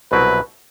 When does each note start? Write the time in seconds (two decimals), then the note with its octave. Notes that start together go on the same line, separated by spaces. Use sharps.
0.12 C2 B2 F#3 C4 E4 B4